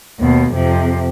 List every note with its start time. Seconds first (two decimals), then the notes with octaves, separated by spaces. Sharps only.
0.19 D#2 B2
0.53 F2 C3